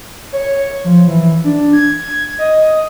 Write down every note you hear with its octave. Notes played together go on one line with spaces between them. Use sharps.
C#5
F3
E3
D4
G#6
D#5